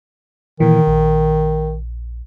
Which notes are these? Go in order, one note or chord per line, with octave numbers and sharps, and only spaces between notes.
A#2 D#3 E3
A#1